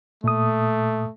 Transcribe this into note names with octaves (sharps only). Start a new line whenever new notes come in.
A#2 A3 D#6